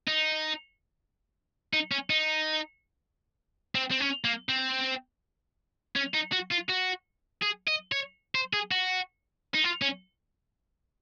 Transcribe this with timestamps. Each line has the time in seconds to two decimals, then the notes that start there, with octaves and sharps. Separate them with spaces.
0.07 D#4
1.73 D#4
1.92 C#4
2.10 D#4
3.75 C4
3.91 C4
4.00 C#4
4.24 A#3
4.49 C4
5.96 C#4
6.14 D#4
6.32 F#4
6.52 F4
6.69 F#4
7.43 G#4
7.68 D#5
7.92 C#5
8.35 C5
8.53 G#4
8.71 F#4
9.54 D#4
9.64 F4
9.82 C#4